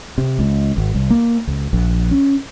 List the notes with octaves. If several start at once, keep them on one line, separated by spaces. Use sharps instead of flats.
C3
C#2
G#1
C2
A#3
C#2
A#1
C#4